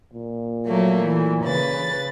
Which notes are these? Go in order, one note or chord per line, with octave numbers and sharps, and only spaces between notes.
A#2
F#3 A3 A#3
E3
C#3 B4 A6